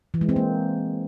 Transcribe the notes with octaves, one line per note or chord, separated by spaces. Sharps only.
E3
G#3
C4
A#3